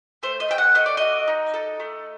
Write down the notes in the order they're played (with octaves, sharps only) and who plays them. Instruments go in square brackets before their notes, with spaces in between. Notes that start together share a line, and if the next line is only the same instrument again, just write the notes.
[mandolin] A3 C5
D#5
A3 G5
F#5
A3 D#5
D5
F#4 D#5
D#4
A4
A3